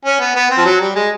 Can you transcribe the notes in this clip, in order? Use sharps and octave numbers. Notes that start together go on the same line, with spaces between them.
C#4
B3
B3
C4
F3
F#3
G3
G#3